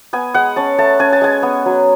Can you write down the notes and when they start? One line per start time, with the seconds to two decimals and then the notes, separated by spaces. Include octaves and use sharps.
0.13 B3 G#5
0.34 G#3 F#5
0.56 C#4 A5
0.78 A3 A5
0.99 C#4 G#5
1.13 A5
1.21 G#3 G#5
1.43 B3
1.66 F#3